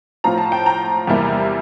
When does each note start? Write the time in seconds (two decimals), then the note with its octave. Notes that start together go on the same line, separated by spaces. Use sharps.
0.24 A2 F3 C4 F4 A#5
0.38 A5
0.52 G5
0.66 A#5
1.07 E2 C3 G3 A#3 E4